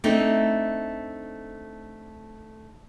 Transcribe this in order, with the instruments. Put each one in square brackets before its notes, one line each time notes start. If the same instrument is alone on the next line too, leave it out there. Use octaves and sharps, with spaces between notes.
[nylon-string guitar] A3 C4 D4 D#4